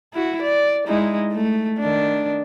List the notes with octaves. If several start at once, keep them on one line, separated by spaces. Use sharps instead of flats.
E4 F#4
D5
G#3 D#4 E4
A3
D#3 D4